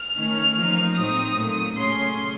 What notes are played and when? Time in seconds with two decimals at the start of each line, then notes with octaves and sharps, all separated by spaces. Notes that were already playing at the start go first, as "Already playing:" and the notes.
Already playing: F6
0.16 D#3 A3 C#4
0.56 F3 A#3 D#4
0.96 A2 F#3 C4 D#4 D#6
1.36 A#2 F#3 A3
1.76 C#3 A3 C#4 C6